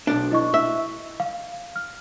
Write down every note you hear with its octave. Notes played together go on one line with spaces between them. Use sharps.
B1 D4
E4 D#5 C#6
E5
F5
F6